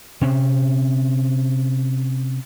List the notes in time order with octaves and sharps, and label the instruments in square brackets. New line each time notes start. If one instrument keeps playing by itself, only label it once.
[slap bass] C3 C4 C#4